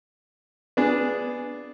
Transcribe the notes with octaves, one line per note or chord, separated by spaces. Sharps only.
B3 D4 G#4